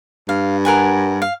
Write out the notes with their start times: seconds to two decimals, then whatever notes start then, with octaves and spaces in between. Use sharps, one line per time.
0.29 G2 F5
0.65 A#4 F#5 G#5
1.22 F5